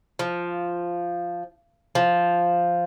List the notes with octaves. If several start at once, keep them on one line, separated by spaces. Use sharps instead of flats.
F3
F3